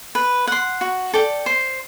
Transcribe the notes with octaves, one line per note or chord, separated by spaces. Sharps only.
B4
F#5 C6
F#4
A4 D5 G5
C5